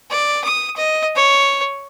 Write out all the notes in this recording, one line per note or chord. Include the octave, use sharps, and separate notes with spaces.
D5
D#6
D#5
C#5